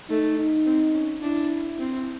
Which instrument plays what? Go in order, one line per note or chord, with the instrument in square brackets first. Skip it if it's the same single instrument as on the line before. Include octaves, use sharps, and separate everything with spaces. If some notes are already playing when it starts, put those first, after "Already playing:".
[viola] A3 [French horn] D#4
[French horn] D#4
[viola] C4
C#4
[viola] D4 [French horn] E4
[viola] C4